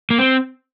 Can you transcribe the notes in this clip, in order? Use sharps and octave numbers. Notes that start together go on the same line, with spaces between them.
A#3
C4